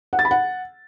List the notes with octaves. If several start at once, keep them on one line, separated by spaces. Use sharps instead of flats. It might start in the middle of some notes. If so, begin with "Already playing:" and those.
F#5
A6
B5
F#5